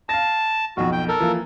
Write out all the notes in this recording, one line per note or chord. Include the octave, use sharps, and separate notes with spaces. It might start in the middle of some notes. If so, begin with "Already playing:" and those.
F5 A5 A#6
B1 F2 F#4
G5
A4 A#4
E3 F3 A#3